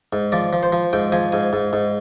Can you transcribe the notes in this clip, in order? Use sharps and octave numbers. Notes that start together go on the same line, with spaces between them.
G#2
F3 D5
F3
C5
F3
G#2 G5
F3 G#5
G#2 G#5
G#2
G#2